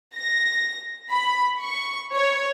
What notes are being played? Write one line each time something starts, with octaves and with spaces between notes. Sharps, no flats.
A#6
B5
C#6
C#5